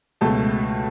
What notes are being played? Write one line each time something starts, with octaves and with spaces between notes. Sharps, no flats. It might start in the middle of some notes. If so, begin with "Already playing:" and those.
C#2 B2 A3 A5